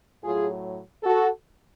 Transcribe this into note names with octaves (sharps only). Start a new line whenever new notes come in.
A2 F#3 F4 G#4
F#4 A4